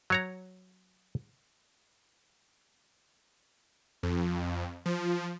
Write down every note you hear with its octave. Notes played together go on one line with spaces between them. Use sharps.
F#3 C#5 A#5
F2
F3